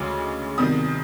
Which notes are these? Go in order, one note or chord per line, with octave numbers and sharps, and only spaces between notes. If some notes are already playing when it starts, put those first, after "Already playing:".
Already playing: D2 C#3 E3 G#3 D6
E2 C3 D#3 G3 D#6